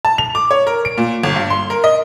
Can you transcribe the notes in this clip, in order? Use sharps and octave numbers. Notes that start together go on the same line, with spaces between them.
A5
F7
D6
C#5
A#4
D7
A#2
G1
G2
C6
A#4
D#5